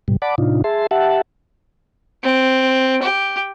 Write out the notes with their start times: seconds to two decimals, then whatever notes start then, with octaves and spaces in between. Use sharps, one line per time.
0.08 G#2 B2 G3
0.22 D5 F#5 A5 B5 D6
0.38 A2 C3 D4 D#4 F4
0.64 G#4 E5 A5 C6
0.91 G4 E5 F#5 A5
2.23 C4
3.02 G4